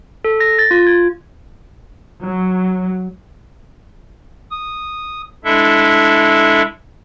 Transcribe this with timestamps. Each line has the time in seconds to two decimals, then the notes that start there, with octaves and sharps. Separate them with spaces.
0.24 A4
0.40 A#6
0.59 A6
0.71 F4
0.87 G#6
2.22 F#3
4.51 D#6
5.44 G#3 D4 E4 A4 E5